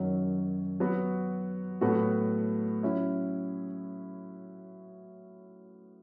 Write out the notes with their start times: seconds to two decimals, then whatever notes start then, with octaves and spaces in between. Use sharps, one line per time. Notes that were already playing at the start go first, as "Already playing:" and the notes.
Already playing: F#2 D#3 F#3 C#4
0.80 F#3 B3 F#4
1.81 A2 F#3 B3 F#4 A4
2.83 F#3 C#4 E4